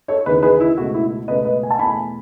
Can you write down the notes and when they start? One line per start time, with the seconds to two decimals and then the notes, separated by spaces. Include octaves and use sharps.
0.08 A4 C#5
0.26 D#2 C#3 E3 G#4 B4
0.43 G#4 B4
0.60 E4
0.77 C#2 B2 A3 F#4
0.94 E4
1.28 C#2 B2 A3 B4 D#5
1.45 B4 D#5
1.63 G#5
1.71 A5
1.79 E2 B2 A3 G#5 B5